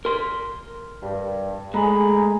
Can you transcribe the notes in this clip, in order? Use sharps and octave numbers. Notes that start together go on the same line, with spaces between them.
A#4 C6
G2
G#3 A3 G#4 A#5 B5